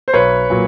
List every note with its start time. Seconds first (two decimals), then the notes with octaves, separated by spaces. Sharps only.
0.08 C5
0.13 B1 B4 C#5
0.50 A#2 F#3